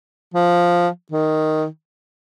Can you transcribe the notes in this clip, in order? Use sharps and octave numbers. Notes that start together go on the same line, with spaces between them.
F3
D#3